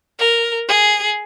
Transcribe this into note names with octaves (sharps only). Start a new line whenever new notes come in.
A#4
G#4